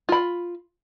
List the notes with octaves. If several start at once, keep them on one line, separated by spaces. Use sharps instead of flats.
F4 B5